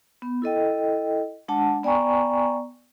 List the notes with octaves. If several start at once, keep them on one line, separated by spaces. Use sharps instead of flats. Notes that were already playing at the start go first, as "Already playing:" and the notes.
B3
E4 A4 D#5 G5
G#3 D4 F#5 A5
B3 D5 G5 G#5 A#5 C#6